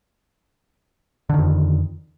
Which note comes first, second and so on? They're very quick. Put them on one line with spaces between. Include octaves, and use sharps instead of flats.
D3 D#3 F2